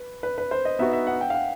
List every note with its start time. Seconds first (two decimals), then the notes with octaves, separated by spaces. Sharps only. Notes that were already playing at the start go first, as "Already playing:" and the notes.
Already playing: B4
0.23 B4
0.38 B4
0.51 C5
0.65 D#5
0.79 B3 D#4 F#4 B4 E5
0.93 E5
1.07 F#5
1.21 G5
1.30 F5
1.34 F#5